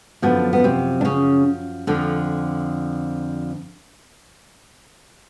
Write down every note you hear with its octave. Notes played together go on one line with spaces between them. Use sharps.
F#2 B2 D3 F3 B3
B3
C3 C4
D4
C#3 C#4
F2 D3 F3